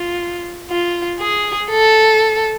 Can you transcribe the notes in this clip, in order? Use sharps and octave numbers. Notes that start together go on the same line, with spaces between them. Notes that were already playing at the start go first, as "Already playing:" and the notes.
Already playing: F4
F4
G#4
A4